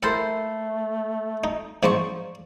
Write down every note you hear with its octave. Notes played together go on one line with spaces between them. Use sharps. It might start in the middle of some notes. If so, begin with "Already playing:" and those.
A3 A#3 E4 A4 C5
D#4
G#2 F3 A#3 C5 D5 C#6